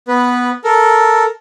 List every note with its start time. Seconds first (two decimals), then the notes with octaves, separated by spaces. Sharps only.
0.08 B3 B4
0.64 A4 A#4